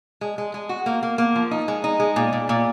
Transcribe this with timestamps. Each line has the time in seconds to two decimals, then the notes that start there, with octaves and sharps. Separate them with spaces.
0.21 G#3
0.38 G#3
0.54 G#3
0.69 F#4
0.86 A#3
1.03 A#3
1.18 A#3
1.35 F3
1.51 D#4
1.68 G#3
1.84 D#4
2.00 G#3
2.16 A#2
2.33 A#2
2.49 A#2